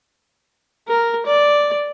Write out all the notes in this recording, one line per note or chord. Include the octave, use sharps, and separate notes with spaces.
A#4
D5